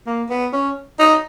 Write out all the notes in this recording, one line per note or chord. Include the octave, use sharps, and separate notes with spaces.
A#3
B3
C#4
D#4